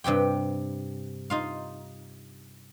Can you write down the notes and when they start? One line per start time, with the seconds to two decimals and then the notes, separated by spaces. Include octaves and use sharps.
0.04 G2 C3 G4 G5
1.30 D#4 F4 F5